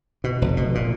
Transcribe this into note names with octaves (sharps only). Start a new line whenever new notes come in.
B2
F1
B2
A#2